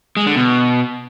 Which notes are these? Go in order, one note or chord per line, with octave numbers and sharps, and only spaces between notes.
G#3
D3
B2